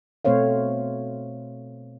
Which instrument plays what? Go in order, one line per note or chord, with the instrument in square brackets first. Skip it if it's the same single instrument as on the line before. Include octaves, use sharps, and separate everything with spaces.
[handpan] B2 A3 C4 C5 C#5 F5